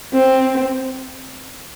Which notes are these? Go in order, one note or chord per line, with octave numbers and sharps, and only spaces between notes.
C4